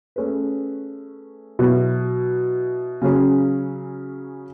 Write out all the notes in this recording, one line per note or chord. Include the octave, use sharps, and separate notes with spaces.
A3 C#4 G#4 B4
B2 F#3 B3 E4
C#3 F#3 C#4 G#4